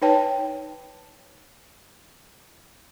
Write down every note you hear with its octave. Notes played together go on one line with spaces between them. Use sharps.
D#4 B4 C#5 G5 A5